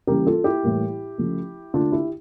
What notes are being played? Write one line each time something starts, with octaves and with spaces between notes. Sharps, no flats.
C#3 E3 G3 A#3 G4 A#4
F4 A4
E4 G4
A2 E3 G3 A#3
C#3 F3 A3
D3 A3 D4 F4
E4 G4